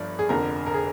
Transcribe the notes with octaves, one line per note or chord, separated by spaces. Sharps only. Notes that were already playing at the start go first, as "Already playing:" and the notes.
Already playing: G1 G2 F3 D5
G#4
F1 F2 D3 A#4
A#4
G#4